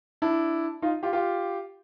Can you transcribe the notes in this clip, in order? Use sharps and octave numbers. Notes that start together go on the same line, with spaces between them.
D4 E4
D#4 F4
F4 G4
F4 G4